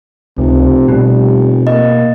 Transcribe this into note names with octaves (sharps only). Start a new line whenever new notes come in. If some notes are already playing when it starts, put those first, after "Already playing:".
F1 C#2 C3
B2 G3
A#3 D#5